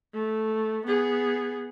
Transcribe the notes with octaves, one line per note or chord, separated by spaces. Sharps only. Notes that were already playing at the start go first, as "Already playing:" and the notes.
A3
B3 G#4